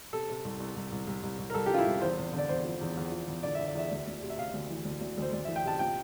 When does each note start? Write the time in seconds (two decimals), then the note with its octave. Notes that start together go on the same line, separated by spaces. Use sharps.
0.13 C3 A4
0.30 C3
0.45 C2
0.60 C2
0.76 C2
0.92 C2
1.07 C2
1.23 C2
1.39 C2
1.50 A#4
1.54 C2 A4
1.66 G4
1.70 F3 F4
1.78 E4
1.87 C2
2.02 E2 C5
2.18 E2
2.33 D3
2.38 D5
2.49 E2 C5
2.65 F3
2.81 E2
2.97 E2
3.12 F3
3.28 E2
3.43 D3 D5
3.55 E5
3.59 D3
3.68 D5
3.75 E2 E5
3.91 D2
4.07 D2
4.22 C3
4.30 E5
4.38 C3 F5
4.54 D2
4.70 E3
4.85 D2
5.01 D2
5.17 D2 C5
5.33 D2 D5
5.45 E3 E5
5.56 G5
5.64 C3 A5
5.79 A#2 G5